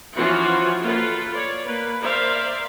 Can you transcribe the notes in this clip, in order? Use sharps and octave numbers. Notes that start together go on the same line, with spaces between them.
E3 F3 C#4 F4 F#4
A#3 F4 A4 B4
C#5 D5
A#3 B4
A#4 C5 D5 E5 F5